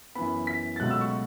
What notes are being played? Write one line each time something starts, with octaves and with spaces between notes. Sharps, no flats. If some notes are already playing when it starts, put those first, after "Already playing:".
F#2 E3 B3 B5
B6
A6
C#2 B2 F#3 A3 F#6
E6
C#6